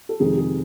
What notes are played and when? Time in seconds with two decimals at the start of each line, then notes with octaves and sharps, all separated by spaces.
0.09 A4
0.20 F2 C3 D#3 G#3 G#4
0.38 G#4